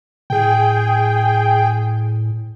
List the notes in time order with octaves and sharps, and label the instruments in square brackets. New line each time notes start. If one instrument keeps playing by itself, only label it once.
[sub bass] A2 [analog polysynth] G#4 G5